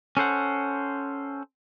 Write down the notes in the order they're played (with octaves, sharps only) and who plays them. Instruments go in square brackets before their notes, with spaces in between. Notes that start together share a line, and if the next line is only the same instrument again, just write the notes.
[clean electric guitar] C#4 A4 C5 F#5